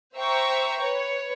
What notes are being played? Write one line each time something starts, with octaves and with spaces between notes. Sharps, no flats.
C5 E5 G5 A#5 C#6
B4 C#5